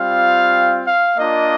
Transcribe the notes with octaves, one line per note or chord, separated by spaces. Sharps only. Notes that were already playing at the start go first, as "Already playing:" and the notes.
Already playing: G3 C4 F4 F5
F5
A#3 D4 F4 D#5